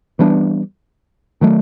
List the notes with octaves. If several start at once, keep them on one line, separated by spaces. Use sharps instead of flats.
E3 G3 B3 D4
D#3 F#3 A3